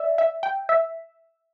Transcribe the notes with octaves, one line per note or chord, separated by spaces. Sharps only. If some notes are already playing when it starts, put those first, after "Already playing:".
Already playing: D5 E5
E5
G5
E5